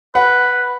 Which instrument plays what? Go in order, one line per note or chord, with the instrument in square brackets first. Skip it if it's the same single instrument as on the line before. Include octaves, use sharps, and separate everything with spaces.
[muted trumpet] B4 [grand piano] F#5